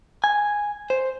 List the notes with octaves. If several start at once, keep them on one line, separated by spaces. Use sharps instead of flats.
G#5
C5